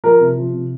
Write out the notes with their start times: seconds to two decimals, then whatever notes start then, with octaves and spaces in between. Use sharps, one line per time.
0.04 F3 A#4
0.20 C3
0.37 F3
0.53 C3